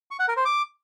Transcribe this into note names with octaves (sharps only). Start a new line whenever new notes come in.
C#6
F#5
A#4
C5
D6